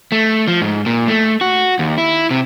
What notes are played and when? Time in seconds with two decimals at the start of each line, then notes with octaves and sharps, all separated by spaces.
0.12 A3
0.48 F3
0.62 G#2
0.86 A#2
1.08 A3
1.41 F#4
1.79 D#2
1.98 E4
2.31 C3